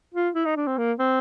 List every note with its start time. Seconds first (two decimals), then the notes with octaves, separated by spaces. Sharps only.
0.15 F4
0.35 E4
0.46 D#4
0.57 D4
0.67 C4
0.78 A#3
0.99 C4